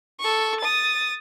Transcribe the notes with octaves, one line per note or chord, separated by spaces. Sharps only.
A4 C#6
D#6 A6